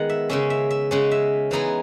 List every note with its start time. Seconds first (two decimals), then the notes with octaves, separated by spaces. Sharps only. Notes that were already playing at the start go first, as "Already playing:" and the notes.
Already playing: D#3 G#3 B3 F#5
0.09 E5
0.30 C#3 G#3 C#4 E5
0.50 E5
0.71 E5
0.91 C#3 G#3 C#4 F#5
1.11 E5
1.51 E3 G#3 B3 D#4 G#4